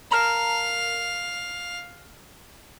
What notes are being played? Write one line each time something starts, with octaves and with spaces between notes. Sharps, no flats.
A#4 F5 A5 A#5